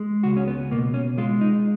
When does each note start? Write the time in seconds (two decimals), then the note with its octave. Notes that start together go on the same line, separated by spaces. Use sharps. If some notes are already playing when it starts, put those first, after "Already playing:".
Already playing: G#3
0.23 C#2 F#4
0.36 C#4
0.48 B3
0.71 B2 A#3
0.94 C#4
1.18 G#3 F4
1.41 D#4